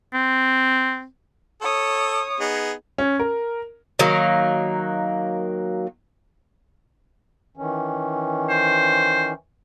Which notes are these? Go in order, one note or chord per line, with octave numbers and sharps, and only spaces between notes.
C4
A4 C#5 D#6
B3 D#4 G#4
C#4
A#4
D#3 F#3 A#3
D#3 E3 C#4
C5